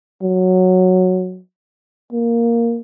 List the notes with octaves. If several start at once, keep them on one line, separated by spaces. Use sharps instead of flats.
F#3
A#3